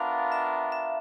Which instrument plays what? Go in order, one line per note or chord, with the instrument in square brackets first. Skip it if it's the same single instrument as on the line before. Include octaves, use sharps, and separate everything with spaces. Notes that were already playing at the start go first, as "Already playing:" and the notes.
Already playing: [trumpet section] B3 D4 F4 A#4 [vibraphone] E5 F5
[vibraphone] E5
E5